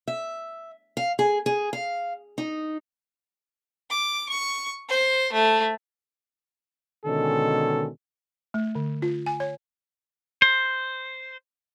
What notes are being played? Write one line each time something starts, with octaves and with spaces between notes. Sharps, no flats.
E5
F5
G#4
G#4
F5
D#4
D6
C#6
C5
A3
B2 D3 D#3 G#3 C#4 A4
A3
D3
F4
G#5
C#5
C5